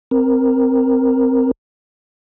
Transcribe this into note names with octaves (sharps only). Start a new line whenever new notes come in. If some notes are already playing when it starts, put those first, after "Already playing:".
C4 A#4